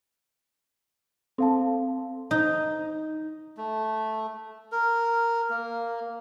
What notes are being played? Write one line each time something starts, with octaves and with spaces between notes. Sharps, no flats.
C4 A4 F5 A5
D#4
A3
A#4
A#3